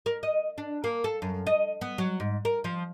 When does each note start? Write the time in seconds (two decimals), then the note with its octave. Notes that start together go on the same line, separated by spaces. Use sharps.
0.06 A#4
0.23 D#5
0.58 D4
0.84 A#3
1.04 A4
1.22 F#2
1.47 D#5
1.81 B3
1.98 F#3
2.20 G#2
2.45 A#4
2.64 F3